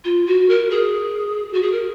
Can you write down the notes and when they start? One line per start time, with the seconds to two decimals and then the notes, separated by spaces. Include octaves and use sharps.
0.04 F4
0.26 F#4
0.49 A#4
0.70 G#4
1.53 F#4
1.62 G#4
1.72 A#4